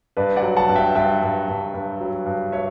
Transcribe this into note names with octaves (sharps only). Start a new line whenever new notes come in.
G2 B4 D5
D5 F#5
F#3
F#5 A5
G2
E5 G5
G2 E5 G5
G2
G2
G2
F#3
G2
C#5 E5